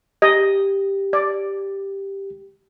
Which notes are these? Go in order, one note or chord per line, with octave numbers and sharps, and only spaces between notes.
G4 D#5
D5